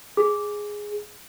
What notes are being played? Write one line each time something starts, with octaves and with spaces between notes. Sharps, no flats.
G#4